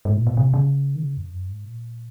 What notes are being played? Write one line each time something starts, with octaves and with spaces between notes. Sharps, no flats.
G#2
A#2
A#2
C3
C#3
D#3
C#3
F2
F#2
G#2
A#2